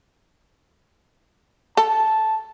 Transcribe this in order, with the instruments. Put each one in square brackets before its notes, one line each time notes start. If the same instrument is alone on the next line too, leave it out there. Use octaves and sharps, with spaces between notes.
[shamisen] A4 [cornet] A5